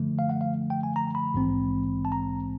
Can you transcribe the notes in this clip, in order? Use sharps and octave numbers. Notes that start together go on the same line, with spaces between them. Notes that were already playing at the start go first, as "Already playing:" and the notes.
Already playing: F#2 D3 F3 A3
F5
F#5
F5
G5
G#5
A#5
B5
A#1 G#2 E3 G#3 C4
A5
A#5